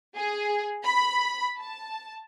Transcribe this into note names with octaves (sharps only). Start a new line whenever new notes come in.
G#4
B5
A5